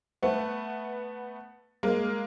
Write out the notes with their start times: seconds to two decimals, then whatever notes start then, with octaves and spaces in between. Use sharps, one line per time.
0.23 A3 B3
1.83 G#3 A#3